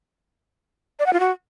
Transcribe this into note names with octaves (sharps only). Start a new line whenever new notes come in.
D5
F#5
F4
F#4